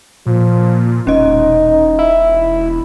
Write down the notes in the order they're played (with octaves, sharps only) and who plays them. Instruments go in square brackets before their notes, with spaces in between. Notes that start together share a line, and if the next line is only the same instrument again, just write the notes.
[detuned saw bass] A#2 [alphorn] F3
[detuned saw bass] E1 [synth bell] C#4 D#5 [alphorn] D#4
[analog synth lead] E4